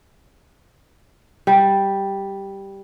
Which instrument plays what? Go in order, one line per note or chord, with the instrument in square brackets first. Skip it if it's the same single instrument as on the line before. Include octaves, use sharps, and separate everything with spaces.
[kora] G3